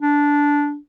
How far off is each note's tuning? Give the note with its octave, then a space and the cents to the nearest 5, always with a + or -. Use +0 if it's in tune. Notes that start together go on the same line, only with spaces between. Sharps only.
D4 -10